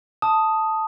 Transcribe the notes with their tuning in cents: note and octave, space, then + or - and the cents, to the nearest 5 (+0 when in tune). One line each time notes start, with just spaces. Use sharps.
A5 +0 D#6 +0